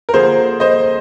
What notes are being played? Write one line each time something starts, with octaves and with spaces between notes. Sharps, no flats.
A#4
D3 F3 A#3 G#4 C5
C5 D#5